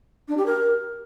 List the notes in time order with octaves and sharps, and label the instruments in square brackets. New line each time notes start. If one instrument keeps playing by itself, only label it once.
[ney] D4
G4
A#4